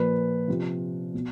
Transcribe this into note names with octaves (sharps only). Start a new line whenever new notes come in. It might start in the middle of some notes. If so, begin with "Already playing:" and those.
Already playing: A#2 F3 B4
C3 F3
B2